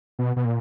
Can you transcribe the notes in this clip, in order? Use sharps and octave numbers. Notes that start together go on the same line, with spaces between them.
B2
B2
A#2